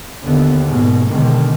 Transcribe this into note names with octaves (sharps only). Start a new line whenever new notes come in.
D#2 D3 B3
G#2 B2 G#3 A#3
B2 D3 D#3 G#3